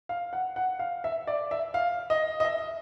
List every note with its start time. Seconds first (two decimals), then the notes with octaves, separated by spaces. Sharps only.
0.09 F5
0.33 F#5
0.56 F#5
0.79 F5
1.04 E5
1.27 D5
1.51 E5
1.74 F5
2.10 D#5
2.40 D#5
2.45 E5